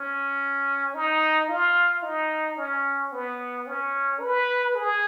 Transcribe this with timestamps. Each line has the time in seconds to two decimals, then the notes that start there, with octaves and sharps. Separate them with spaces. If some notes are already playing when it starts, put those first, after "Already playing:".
Already playing: C#4
0.94 D#4
1.48 F4
2.03 D#4
2.57 C#4
3.12 B3
3.67 C#4
4.20 B4
4.75 G#4